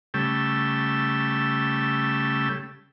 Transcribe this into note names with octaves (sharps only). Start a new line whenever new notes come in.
C#3 G3 A3 G5 E6